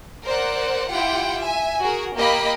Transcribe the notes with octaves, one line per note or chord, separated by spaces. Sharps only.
A#4 C5 D5 F#5
E4 F4 G4 F#5 G5
E5 G#5
F#4 G#4 A#4
A#3 G4 D#5 B5